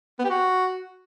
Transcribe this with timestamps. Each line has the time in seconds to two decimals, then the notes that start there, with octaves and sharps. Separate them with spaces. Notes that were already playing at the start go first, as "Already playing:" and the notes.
0.19 B3
0.25 G4
0.30 F#4